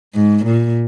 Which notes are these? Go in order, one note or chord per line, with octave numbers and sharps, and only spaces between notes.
G#2
A#2